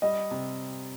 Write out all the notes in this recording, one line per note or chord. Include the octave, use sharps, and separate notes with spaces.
G3 D#5
C3